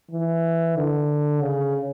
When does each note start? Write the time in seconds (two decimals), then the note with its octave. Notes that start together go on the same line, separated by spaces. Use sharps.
0.11 E3
0.76 D3
1.41 C#3